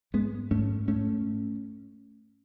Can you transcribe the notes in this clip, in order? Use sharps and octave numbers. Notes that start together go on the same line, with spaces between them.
G#2 G#3 B3
G#2 A3 C#4
G#2 A3 C#4